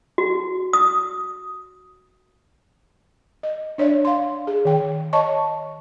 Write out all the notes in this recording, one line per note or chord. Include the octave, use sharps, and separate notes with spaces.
F#4
D#6
D#5
D4 C#5 D5 E5
F5 C6
G#4
D#3 G5
C#5 D#5 A5 C#6